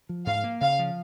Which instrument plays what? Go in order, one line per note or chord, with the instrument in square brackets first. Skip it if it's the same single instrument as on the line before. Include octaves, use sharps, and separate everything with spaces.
[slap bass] F3
[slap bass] G#2 [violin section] F5
[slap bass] A#3
[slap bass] C#3 [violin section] F5
[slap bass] F3